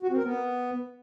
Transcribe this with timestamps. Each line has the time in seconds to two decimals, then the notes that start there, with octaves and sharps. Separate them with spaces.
0.03 F#4
0.10 C4
0.17 A#4
0.24 B3